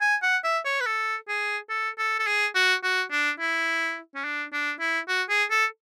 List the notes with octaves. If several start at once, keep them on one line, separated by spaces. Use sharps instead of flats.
G#5
F#5
E5
C#5
B4
A4
G#4
A4
A4
A4
G#4
F#4
F#4
D4
E4
C#4
D4
D4
E4
F#4
G#4
A4